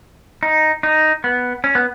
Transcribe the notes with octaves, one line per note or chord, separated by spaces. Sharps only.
D#4
D#4
B3
C#4
B3